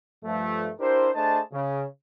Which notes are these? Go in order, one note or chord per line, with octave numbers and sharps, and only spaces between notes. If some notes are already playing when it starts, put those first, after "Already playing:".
G2 F3 A3
D4 E4 G4 A#4 C5
A3 D4 G#4 C5 D#5 A5
C#3